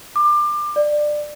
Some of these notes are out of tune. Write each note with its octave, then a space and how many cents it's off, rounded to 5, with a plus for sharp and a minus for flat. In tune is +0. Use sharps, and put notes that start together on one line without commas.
D6 +25
D5 +20